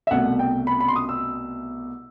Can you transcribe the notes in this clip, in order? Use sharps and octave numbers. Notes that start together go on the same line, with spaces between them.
E5
C2 B2 A3 F#5
G5
B5
B5
C6
D#6
E6